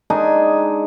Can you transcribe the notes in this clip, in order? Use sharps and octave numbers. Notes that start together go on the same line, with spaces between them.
G#3 D4 D#4 G#5